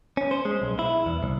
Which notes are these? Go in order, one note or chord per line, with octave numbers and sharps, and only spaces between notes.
C#4
C5
G#3
B1
E4
E2
C2